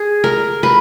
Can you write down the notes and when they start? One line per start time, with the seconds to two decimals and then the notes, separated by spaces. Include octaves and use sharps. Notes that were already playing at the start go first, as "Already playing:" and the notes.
Already playing: G#4
0.24 A#4
0.63 B4